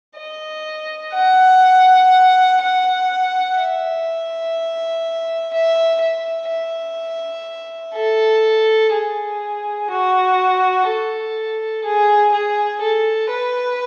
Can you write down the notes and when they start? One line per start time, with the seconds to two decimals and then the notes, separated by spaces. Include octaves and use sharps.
0.18 D#5
1.14 F#5
2.61 F#5
3.57 E5
5.53 E5
6.01 E5
6.49 E5
7.95 A4
8.92 G#4
9.90 F#4
10.87 A4
11.84 G#4
12.32 G#4
12.81 A4
13.30 B4